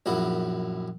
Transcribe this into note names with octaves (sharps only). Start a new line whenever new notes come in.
A#1 F#2 E4 F#4